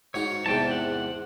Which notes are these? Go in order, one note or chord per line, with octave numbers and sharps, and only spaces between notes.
G#2 D#4 F#4 C#5
E2 G#2 C3 G5 A5
F#5